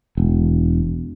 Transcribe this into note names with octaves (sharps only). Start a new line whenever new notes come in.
E1